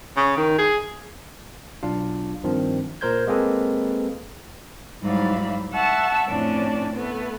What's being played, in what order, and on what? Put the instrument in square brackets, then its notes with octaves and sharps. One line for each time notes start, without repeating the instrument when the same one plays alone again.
[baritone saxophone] C#3
D#3
G#4
[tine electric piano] B1 D4 F4 F5
G2 D#3 F3 C4
A#2 A#4 C5 G6 G#6
G#3 A#3 C4 G#4 A4 B4
[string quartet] G#2 F#3 G3 E4 F5 B5
E5 F#5 A5 C#6 E6
F2 A2 C#4 D4
A3 B3